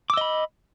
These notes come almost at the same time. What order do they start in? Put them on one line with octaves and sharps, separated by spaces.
D6 E6 D#5 B5